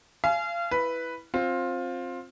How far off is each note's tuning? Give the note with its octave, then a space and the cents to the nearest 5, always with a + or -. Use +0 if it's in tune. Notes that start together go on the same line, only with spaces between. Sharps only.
F5 -30 G#5 +30
E4 +0 B4 +0
C4 +15 F4 +15